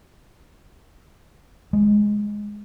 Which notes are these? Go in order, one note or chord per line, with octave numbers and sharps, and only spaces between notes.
G#3